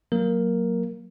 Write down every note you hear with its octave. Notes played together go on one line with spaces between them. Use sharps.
F#3 A#3 A#4